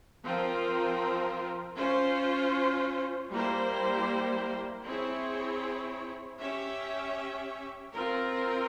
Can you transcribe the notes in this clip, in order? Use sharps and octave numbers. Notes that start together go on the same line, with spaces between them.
F3 C4 F4 A#4
C#4 F4 C5
G3 A#3 E4 G4 C5
C4 E4 G#4 C#5
C#4 G4 C#5 E5
C4 F4 A#4